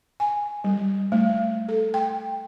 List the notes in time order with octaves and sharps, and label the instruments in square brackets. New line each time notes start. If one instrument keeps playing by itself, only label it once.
[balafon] G#5
G3
A3
A4
G5